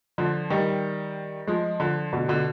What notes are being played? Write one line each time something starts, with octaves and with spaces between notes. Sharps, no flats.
D3 F3
D#3 G3
F3 G#3
D3 F3
B2 D3
B2 D3